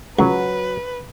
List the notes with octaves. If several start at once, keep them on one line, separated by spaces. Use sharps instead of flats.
C#2 F#3 B4